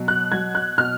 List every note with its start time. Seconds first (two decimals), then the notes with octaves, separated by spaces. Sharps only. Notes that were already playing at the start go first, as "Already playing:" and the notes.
Already playing: B2 F#3
0.08 F#6
0.32 F#3 G#6
0.55 F#6
0.78 B2 F6